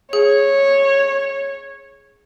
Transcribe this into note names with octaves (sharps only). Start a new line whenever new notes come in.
G#4 C#5